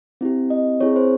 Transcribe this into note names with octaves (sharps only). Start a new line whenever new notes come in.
C4 E4 G4
D#5
C4 E4 G#4 C#5
C5